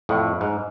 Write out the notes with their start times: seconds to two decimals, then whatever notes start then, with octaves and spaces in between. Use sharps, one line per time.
0.09 F2 A2
0.41 G#2